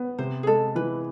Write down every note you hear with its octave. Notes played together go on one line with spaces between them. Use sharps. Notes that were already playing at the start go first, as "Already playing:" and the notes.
Already playing: B3
C3 C5
G#4
G#3 A4
E3 B4